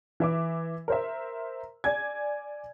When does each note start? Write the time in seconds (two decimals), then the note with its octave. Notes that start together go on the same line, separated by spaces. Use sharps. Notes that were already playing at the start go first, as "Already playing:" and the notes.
0.20 E3 E5 D6
0.88 A#4 C5 E5
1.84 D5 G#5 G#6